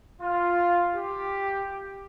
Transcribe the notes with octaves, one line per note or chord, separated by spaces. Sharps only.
F4
G4